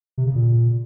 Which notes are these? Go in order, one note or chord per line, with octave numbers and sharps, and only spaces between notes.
C3
C#3
A#2